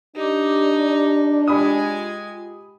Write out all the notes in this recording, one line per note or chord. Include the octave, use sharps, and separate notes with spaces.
D4 D#4 G4 D6
G#3 F4 G4 G#5 B5 D#6